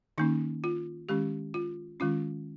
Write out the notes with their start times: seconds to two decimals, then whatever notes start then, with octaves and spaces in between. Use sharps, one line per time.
0.18 D#3 A#3 C#4 D#4
0.64 F4
1.09 D#3 G#3 C#4 G4
1.54 F4
2.00 D#3 G#3 C#4 F4